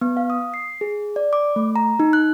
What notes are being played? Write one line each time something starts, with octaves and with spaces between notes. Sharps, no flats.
B3
F5
D#6
C7
G#4
D5
D6
A3
A#5
D#4
F#6